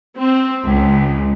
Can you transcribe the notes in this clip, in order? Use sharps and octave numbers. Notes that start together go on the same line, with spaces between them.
C4
C#2